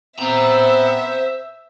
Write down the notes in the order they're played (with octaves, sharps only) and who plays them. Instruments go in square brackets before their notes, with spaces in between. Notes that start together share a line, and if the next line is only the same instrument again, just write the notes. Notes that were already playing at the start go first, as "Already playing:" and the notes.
[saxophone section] B3 C4 [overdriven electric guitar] C5 A#5 [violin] E5